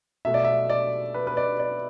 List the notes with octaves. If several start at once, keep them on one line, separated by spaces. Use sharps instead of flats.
B2 A3 E5
D5
E5
D5
B4
B4
D5
D5